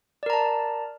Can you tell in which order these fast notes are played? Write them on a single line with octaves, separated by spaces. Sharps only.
D5 A#4 A#5 A5